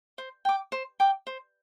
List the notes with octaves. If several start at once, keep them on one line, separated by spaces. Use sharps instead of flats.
C5
G5 D6
C5
G5 D6
C5